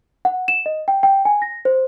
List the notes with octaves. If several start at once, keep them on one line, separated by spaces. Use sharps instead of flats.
F#5
E7
D#5
G5
G5
G#5
A#6
C5